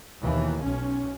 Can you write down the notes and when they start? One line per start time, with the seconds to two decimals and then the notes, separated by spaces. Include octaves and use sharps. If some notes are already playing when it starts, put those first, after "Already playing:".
0.21 D#2 B2 E3
0.61 B1 C#4